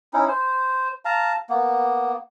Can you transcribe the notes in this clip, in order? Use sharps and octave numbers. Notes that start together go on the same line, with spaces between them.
C#4 D#4 E4
C5
F5 A5 A#5
A#3 B3